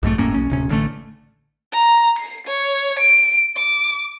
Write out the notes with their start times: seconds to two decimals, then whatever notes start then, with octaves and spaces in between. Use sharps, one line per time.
0.03 B1 F2 G#2 A3
0.18 G1 A2 A#3 C#4
0.34 B1 C#4
0.50 D1 C3 C#4
0.69 A1 D3 A3
1.73 A#5
2.19 C7
2.47 C#5
2.99 D7
3.57 D6